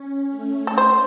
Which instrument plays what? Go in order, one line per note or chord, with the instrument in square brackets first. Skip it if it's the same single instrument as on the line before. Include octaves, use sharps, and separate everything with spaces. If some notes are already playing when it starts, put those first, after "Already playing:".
Already playing: [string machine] C#4
A3
[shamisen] A4
C5